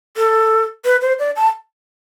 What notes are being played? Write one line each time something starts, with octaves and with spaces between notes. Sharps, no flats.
A4
B4
C5
D5
A5